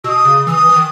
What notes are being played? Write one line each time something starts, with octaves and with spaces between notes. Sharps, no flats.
B2 D#6 E6
C#3
E3 D#6 E6
E3
D#3